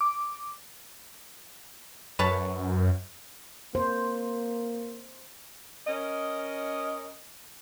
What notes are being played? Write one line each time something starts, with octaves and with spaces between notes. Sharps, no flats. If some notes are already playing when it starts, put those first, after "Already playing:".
D6
F#2 B4 C#5 A5
A#3 C5
C#4 A#4 D#5